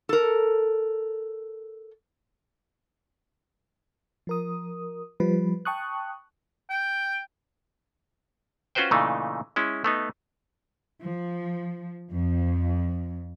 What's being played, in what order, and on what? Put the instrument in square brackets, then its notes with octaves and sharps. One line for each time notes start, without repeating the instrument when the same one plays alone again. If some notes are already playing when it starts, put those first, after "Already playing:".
[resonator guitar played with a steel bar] A4 A#4
[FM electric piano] F3 A#4 D#6
F3 G3 B4
G5 A5 C#6 D#6 F#6
[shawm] G5
[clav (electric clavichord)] C#4 F4 F#4 B4 C5 G5
A#2 C#3 E3 A3 D#4
G#3 C#4 E4
A3 B3 D#4
[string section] F3
F2